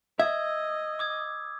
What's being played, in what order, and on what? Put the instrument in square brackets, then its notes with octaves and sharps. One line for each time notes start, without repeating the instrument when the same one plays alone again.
[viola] D#5 [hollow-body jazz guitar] E5 [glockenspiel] E6 G#6
[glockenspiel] D6 D#6 G#6